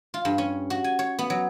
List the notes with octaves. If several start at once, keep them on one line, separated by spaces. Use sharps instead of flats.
F4
G2
C#4
F#4
G#5
C#5
B3
F#3